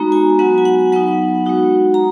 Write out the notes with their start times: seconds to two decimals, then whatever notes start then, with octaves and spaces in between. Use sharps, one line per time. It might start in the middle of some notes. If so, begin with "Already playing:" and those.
Already playing: G#3 B3 D#4 F#4 A#5
0.12 G#5
0.39 F#3 B3 F#4 F#5
0.58 G#5
0.65 F#5
0.92 F#3 B3 D#4 F#5
1.46 G#3 D#4 F#4
1.94 A#5